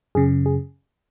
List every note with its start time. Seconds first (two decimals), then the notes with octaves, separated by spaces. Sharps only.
0.15 F#2 C#3 G#4
0.46 G#4